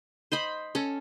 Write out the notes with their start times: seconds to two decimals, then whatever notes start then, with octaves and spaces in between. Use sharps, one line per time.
0.32 C5 D#5 B5
0.75 C#4 A4